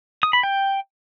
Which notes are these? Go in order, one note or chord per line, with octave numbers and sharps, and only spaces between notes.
D#6
B5
G5